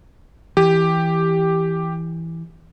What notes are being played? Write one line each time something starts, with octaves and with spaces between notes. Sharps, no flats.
E3 G4